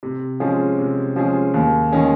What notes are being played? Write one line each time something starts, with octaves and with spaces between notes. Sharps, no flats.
C3
F3 G#3 C#4 G#4
C3
F3 G#3 C#4 G#4
D#2
D#3 G#3 C#4 G#4